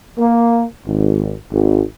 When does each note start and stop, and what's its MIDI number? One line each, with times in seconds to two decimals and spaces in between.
0.18 0.62 58
0.86 1.33 32
1.51 1.82 32